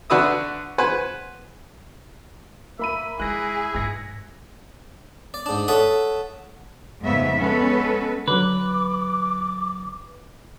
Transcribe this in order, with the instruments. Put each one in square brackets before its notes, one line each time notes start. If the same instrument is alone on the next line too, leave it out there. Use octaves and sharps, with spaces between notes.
[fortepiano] D3 D4 F#4 B4 E5 D#6
B4 C5 F#5 G#5
[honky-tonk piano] A#3 B5 D#7 [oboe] E5
[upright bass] G#3 [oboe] E4 [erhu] G#4 [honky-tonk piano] F#6 A#6
[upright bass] G#2 [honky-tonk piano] G#6 A#6 C#7
[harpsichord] D5
G#2 D4
A4 C#5 E5 F#5 D#6
[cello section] F2 G#2 C#3 B3 E5
G#3 B3 C#4 A4 B4
[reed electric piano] D3 F#3 [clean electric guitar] B4 [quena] D6